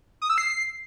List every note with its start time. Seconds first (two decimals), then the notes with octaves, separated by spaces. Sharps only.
0.22 D#6
0.30 E6
0.38 C7